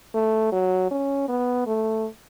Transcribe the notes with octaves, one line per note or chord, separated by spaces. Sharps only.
A3
F#3
C#4
B3
A3